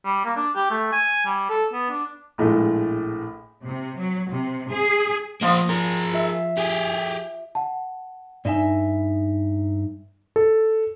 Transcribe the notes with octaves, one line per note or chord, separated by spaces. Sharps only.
G3
A#3
D4
G4
A3
G#5
G3
A4
B3
D4
A#1 A2 G#3 A4
C3
F#3
C3
G#4
F3 A#3 C5 D#5
G#4 A#4
F4 E5
G4 G#4
F#5 A5
G2 D#4 D5 E5 G#5
A4